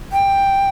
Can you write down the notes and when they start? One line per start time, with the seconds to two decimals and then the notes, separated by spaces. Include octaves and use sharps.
0.12 G5